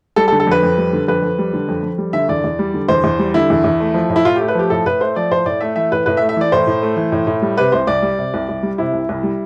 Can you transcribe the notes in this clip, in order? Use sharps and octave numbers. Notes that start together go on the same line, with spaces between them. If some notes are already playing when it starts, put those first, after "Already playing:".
G3 A4
A4
D3
A4
F2 B4
F2
G3
D3
F2 B4
F2
G3
D3
F2
F2
G3
D3 E5
E2 D5
E2
G3
D3
E2 C5
E2
G3
D3 E4
E2
E2
A3
F3
A2
E4
A2 F4
A3 G4
B4
F3 G4
A2 A4
A2 B4
A3 C5
F3 D5
A2 C5
A2 D5
A3 E5
E3 E5
A2 B4
A2 B4
E5
A3
E5
E3 D5
A2 C5
A2
A3
E3
A2
A2
G3
C3 B4
C2 C5
C2 D5
G3
C3
C2
C2
G3
C3 E4
C2
C2
G3